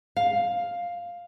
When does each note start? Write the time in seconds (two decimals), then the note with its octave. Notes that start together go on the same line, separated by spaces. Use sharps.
0.17 F5